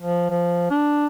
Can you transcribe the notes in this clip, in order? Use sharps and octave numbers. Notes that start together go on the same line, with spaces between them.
F3
F3
D4